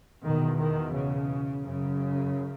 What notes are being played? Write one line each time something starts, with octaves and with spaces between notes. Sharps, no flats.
E2 B2 D#3
D#3
C#3
F#2 C#3